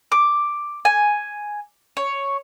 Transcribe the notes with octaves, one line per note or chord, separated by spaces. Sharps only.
D6
G#5
C#5